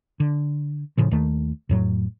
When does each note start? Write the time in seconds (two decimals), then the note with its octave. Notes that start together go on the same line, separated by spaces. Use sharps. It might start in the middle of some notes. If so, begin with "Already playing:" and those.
0.20 D3
0.98 A2 C#3 F3
1.11 D#2 D#3 A3
1.69 F2 A2 F#3